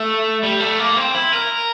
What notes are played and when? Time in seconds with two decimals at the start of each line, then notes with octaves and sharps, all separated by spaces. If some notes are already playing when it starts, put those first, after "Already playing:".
Already playing: A3
0.43 G3
0.60 A3
0.79 A#3
0.97 C4
1.15 E4
1.33 A#4